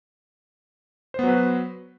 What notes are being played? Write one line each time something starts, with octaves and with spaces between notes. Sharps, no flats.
F#3 B3 F#4 B4 C5